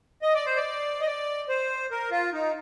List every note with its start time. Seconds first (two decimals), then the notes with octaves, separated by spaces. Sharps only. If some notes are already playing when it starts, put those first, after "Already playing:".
0.22 D#5
0.34 D5
0.46 C5
0.57 D5
1.01 D#5
1.06 D5
1.49 C5
1.91 A#4
2.11 F4
2.33 D#4